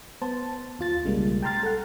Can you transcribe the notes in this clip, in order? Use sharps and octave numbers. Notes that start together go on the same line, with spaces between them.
B3 C5 A5
D#2 F4 A6
B1 C#3 G3 G#3 A#3
G5 A5 A#5 C6 F6 A6
A4 F#5